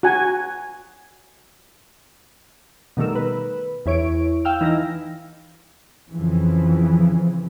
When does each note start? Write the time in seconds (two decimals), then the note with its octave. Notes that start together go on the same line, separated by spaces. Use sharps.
0.03 F#4 F#5 G#5
2.97 B2 D#3 G3 A3 A#4 E6
3.16 B4
3.86 E2 E4 C#5 D7
4.45 F5 G5 E6 F6
4.61 E3 D#4 E6 A#6
6.13 F2 C#3 E3 F3